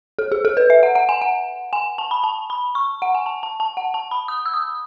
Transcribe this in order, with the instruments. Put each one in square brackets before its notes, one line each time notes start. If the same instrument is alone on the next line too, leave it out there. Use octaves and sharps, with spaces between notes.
[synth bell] A4
G#4
A4
B4
E5
F#5
F#5
G#5
F#5
G#5
A5
B5
A5
B5
C#6
F#5
G#5
A5
A5
A5
F#5
A5
B5
D#6
E6
D#6